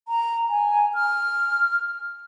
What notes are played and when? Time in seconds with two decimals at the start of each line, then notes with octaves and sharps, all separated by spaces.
0.08 A#5
0.49 G#5
0.94 F6